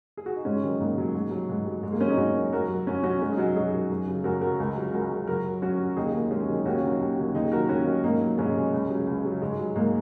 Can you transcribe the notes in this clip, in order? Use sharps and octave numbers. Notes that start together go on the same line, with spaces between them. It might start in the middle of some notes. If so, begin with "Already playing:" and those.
G#4
F#4
D#4
G#2 G#3 C#4
D#3 F#3
G#2 A#3
D#3 F#3
G#2
F#3
G#2
F#3
G#2 G#3
A#3
F#3 G#3 C#4
A#3 D#4
G#2 C#4 F#4
F#3
F#2 F#4 A#4
F#3
F#2 C#4 F#4
F#3 C#4 F#4
F#2 G#3 C#4
D#4
F#3 C#4 F#4
F#2 D#4 G#4
F#3
F#2
C#3 F#3
F#2 F#4 A#4
C#3 F#3 F#4 A#4
C#2
C#3 F#3
C#2 F#4 A#4
C#3 F#3
F#2 F#4 A#4
F#3
F#2 C#4 F#4
F#3
D#2 D#4 G#4
D#3 F#3 A#3
D#2 G#3 C#4
D#3 F#3
D#2 C#4 F#4
D#3 F#3
D#2
D#3 F#3
D#2 D#4 G#4
D#3 F#3 F#4 A#4
D#2 C#4 F#4
D#3 F#3
G#2 A#3 D#4
F#3
G#2 G#3 C#4
F#3
C#2
C#3 F#3
C#2
C#3 F#3
G#2 G#3
F#3
G#2 A#3